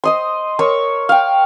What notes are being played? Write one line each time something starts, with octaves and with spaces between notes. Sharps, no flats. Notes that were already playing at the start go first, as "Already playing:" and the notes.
C5 D#5 C6
A#4 C#5 C#6 E6
F5 G5